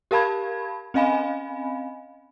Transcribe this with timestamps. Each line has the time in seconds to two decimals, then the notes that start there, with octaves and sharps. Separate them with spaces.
0.11 G4 A#4 F5 A5 B5 G#6
0.94 C4 C#4 D#5 F5 G#5 B5